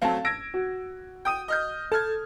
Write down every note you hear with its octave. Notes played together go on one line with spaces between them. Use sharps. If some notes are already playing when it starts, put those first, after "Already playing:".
F#3 A3 C4 F5 A5
E6 G#6 A#6 D7
F#4
G5 D#6 D#7
D#5 F6 G6
A4 A5 F6 G#6